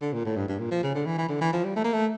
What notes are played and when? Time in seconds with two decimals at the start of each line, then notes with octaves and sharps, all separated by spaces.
0.02 D3
0.13 A#2
0.25 A2
0.37 G2
0.49 G2
0.59 A#2
0.71 F3
0.83 C#3
0.95 D3
1.06 E3
1.18 E3
1.29 D3
1.41 E3
1.53 F3
1.64 G3
1.76 A3
1.84 A#3
1.93 A3